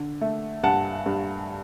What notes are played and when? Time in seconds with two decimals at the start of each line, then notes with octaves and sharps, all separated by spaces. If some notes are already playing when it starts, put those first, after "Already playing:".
Already playing: D3
0.21 A3
0.63 G2 F#5 A5
1.06 G2